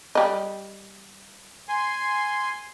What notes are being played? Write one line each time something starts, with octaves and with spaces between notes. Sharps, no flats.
G3 D#5
G#5 C6